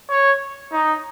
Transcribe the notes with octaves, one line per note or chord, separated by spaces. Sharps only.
C#5
D#4